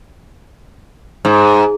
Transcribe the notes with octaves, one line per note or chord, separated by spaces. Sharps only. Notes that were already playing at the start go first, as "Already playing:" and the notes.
G#2